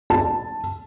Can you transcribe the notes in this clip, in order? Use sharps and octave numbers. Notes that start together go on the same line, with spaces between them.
A5